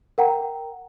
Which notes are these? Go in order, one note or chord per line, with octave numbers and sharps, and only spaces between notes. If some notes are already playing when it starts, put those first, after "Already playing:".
A#4 F#5 G5 A#5